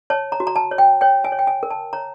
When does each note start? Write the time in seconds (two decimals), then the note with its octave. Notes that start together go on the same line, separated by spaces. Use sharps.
0.10 C#5 A5
0.32 A#5
0.40 F#4
0.47 A#5
0.56 A5
0.71 C#5
0.78 G5
1.01 C#5 G5
1.24 G#5
1.32 C#5
1.39 G5
1.47 G#5
1.63 A#4
1.70 A5
1.93 C#5 A#5